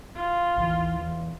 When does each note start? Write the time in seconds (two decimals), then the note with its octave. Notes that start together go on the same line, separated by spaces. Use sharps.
0.15 F4
0.56 A1 D#2 E3
0.98 E2